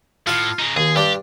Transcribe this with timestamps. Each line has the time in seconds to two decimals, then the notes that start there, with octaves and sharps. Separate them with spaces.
0.27 A2 F4 F5
0.59 C#3 D#4
0.77 D#2 G#4
0.96 G2 D4 G4